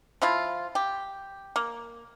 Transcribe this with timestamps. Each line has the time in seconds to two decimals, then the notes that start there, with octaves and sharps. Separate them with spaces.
0.22 F3 E4 F4
0.75 G4
1.56 A#3